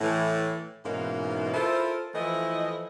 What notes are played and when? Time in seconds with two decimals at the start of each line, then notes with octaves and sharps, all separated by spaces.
0.01 A2 E3
0.85 G#2 B2 E3 A#3 C#4 D#4
1.53 E4 F4 A4 A#4 C5
2.15 E3 F3 A3 E4 D#5